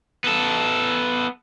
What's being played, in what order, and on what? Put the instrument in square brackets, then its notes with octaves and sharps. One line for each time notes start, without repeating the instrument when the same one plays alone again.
[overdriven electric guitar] B3 A4